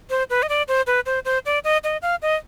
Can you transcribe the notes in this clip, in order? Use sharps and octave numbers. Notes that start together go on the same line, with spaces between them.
C5
B4
D#5
D5
C5
B4
C5
C5
D5
D#5
D#5
F5
D#5